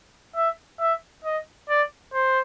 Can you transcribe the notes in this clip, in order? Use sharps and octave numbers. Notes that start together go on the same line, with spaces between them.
E5
E5
D#5
D5
C5